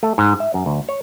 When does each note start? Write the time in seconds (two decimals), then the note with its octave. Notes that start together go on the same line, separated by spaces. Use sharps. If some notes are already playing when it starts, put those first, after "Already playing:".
0.03 A3
0.18 G#2
0.40 E5
0.54 F#2
0.66 D2
0.89 C#5